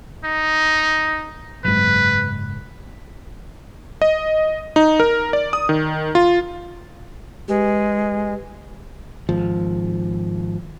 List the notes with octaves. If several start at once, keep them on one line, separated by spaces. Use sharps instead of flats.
D#4
F#1 G#2 B4
D#5
D#4
A#4
D5
D#6
D#3
F4
G#3 G4 B4
G#1 F3